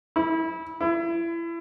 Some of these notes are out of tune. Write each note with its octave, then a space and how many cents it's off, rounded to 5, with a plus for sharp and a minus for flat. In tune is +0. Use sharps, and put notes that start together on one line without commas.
E4 -25
E4 +30